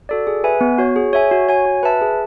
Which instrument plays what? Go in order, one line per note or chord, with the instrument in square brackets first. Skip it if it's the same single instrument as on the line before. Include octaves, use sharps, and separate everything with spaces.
[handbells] F#4 A4 D5
G#4
B4 E5 G#5
B3
F#4 C#5
G#4
C#5 E5 G#5
F#4
C#5 G#5
F#4
B4 E5 A5
G#4